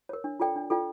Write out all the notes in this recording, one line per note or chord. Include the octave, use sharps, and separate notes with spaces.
A#4 C#5
D4
F4 A4 D5 G5
D4
F4 A4 D5 G5